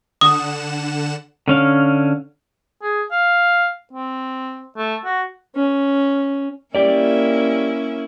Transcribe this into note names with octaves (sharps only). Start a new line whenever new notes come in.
D3 F#5 D#6 E7
D3 C#4 F5
G#4
F5
C4
A3
F#4
C#4
A#3 C#4 E4 G4 D5